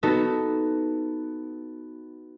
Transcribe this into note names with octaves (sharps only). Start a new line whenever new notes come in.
B3 D#4 F#4 A4